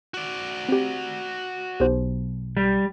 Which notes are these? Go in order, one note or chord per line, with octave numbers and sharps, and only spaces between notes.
F#4 D5
C4 G4
B1 G4 C5
G3